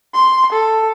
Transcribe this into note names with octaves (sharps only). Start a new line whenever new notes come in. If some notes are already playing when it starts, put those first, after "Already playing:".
C6
A4